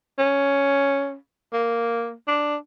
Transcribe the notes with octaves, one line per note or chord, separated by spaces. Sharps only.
C#4
A#3
D4